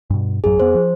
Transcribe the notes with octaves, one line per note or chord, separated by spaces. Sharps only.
G2 B2
A1 F#2 F#3 G#4
F2 B3 C5
F3